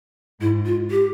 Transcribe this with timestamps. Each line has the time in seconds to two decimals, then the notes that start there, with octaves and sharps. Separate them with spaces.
0.41 G#2 E4
0.66 F4
0.91 G4